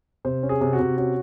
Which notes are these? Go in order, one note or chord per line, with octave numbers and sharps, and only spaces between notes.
C3 C5
C#4
G#4
C3
F#4
C3
C#4 F#4